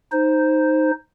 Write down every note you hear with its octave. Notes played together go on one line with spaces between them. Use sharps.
D#4 C5